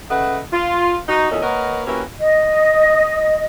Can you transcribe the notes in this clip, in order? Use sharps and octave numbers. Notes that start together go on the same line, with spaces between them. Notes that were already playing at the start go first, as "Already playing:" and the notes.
C#3 A3 B4 D#5 F#5
F4
D#4 F#4
E2 A#2 C#4 D#4 A4 D#5
A#3 A#4 B4 C#5 D#5 F#5
A#3 C#4 E4 F#4 G4 B4
D#5